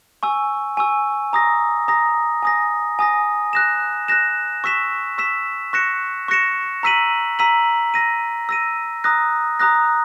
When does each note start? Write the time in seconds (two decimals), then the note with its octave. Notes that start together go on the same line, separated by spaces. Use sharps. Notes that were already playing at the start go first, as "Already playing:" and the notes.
0.23 G#5 C#6 E6
0.77 G#5 C#6 E6
1.33 A#5 D#6 A#6
1.88 A#5 D#6 A#6
2.42 G#5 D#6 A#6
2.99 G#5 D#6 A#6
3.53 F#6 A#6 E7
4.08 F#6 A#6 E7
4.64 C#6 E6 B6 E7
5.18 C#6 E6 B6 E7
5.73 C#6 F#6 A#6 C#7 E7
6.28 C#6 F#6 A#6 C#7 E7
6.83 A#5 E6 B6 D#7 F#7
7.39 A#5 E6 B6 D#7 F#7
7.94 E6 A#6 D#7
8.49 E6 A#6 D#7
9.04 A#5 D#6 F#6 A#6
9.59 A#5 D#6 F#6 A#6